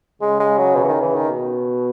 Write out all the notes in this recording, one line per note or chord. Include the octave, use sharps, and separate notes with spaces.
C#3 G#3
G#3
F#3
B2
E3
D#3
E3
D#3
B2